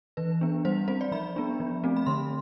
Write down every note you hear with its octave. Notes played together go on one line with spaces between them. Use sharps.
E3 B4
B3 D4
G3 C5
C4 C5
D5
F3 B5
B3 D4
F3
A3 C4
B5
D3 C6